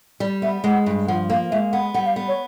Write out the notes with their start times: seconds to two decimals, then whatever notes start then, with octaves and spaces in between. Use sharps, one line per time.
0.20 G3 D5
0.42 B3 E5
0.64 G#3 F#5
0.86 G2
1.08 F3 F#5
1.29 A#3 F5
1.51 G#3 E5
1.73 B3 F#5
1.94 G3 F#5
2.06 F5
2.16 B3
2.28 C#5